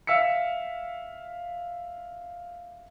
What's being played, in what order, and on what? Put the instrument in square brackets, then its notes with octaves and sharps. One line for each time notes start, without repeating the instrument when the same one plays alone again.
[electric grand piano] E5 F5 E6 B6 C#7